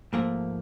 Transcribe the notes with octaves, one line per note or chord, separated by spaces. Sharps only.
G#2 F3 A3 A#3